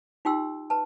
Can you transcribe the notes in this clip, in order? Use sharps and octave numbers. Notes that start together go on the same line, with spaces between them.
D#4 F4 G4 G5 C6 E6
B4 A5